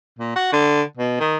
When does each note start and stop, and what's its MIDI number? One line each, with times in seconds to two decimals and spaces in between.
0.19 0.31 46
0.36 0.49 66
0.53 0.82 50
0.97 1.17 47
1.20 1.37 51